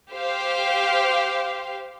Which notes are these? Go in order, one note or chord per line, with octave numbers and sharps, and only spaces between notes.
G4 C5 F5